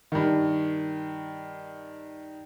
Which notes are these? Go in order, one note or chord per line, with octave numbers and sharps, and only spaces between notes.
G2 D#3